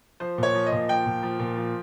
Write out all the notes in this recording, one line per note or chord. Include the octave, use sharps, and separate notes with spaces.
F3 C5
A#2 C#5
F3
D#5
A#2
F3 G5
A#2
F3
A#2
F3